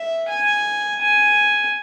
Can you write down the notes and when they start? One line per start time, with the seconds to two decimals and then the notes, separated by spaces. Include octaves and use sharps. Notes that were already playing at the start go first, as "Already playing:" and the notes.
Already playing: E5
0.29 G#5
1.01 G#5